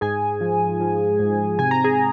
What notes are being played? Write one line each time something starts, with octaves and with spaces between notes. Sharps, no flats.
G#2 G#4 G#5
F3
F3
G#2
C3 G#5
A#5
G#4 G#5